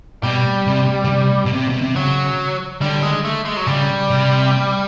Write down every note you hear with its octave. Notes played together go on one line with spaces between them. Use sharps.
B2 G3
C3
C#3
C3
B2
C3
B2
C3
C#3 F#3
D3 G3
G#3
A3
G#3
F#3
C#3 G3
C3